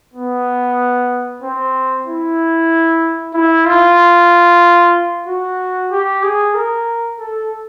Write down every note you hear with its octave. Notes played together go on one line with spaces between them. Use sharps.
B3
C4
E4
E4
F4
F#4
G4
G#4
A#4
A4